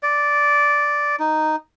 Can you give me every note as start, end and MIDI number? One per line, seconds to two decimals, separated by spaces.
0.03 1.16 74
1.19 1.56 63